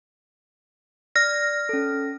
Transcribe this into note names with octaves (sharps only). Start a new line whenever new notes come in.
D5 F6 A#6
C#4 A4